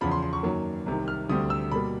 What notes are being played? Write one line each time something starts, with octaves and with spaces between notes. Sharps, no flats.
E2 C#3 F3 B5
C6
C6
C#6
F#2 D#3 F#3 A#3
C2 C3 D#3
F6
D2 D3 G3 C4 D#6
E6
B2 G3 A#3 B5